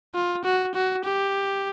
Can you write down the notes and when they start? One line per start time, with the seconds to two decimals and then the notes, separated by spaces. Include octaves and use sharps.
0.15 F4
0.44 F#4
0.75 F#4
1.05 G4